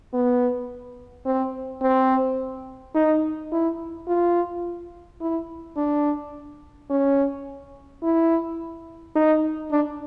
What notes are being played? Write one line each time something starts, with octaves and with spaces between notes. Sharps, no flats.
B3
C4
C4
D#4
E4
F4
E4
D4
C#4
E4
D#4
D4